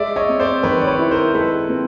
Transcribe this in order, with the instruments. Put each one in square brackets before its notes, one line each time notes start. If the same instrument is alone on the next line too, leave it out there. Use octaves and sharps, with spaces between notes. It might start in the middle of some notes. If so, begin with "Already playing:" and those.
Already playing: [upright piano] G#3 [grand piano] D5 E5
[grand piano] C#5 D#5
[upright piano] C4
[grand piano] C5 D5
[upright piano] D#3 [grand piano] B4 C#5
[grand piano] D5
B4 C#5
[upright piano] E4
[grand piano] A#4 C5
[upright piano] G#3 [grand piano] A4 B4
[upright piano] C4